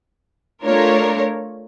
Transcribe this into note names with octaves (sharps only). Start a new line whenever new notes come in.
A3 D4 F4 A#4 C#5